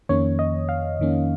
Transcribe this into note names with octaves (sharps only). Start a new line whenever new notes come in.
F2 D#3 A#3 C#4 C#5
D#5
F5
F2 D#3 A#3 C#4